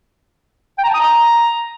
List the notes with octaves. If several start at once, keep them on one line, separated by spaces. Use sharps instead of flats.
G5
A#5
A5
D#6
A#5